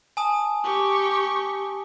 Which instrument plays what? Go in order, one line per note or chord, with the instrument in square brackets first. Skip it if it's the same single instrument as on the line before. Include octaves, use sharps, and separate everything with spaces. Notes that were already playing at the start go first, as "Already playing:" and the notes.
[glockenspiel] G#5 A5 D#6
[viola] G4 C#6